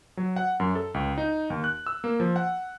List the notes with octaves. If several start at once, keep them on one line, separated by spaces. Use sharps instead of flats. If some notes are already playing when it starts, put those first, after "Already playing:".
F#3
F#5
F#2
A4
C#2
D#4
D#2
F#6
E6
A#3
F3
F#5